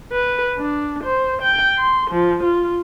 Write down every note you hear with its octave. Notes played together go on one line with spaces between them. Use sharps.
B4
D4
C5
G5
C6
F3
F4